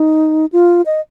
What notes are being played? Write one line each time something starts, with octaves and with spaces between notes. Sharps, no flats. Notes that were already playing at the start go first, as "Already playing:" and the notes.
Already playing: D#4
F4
D#5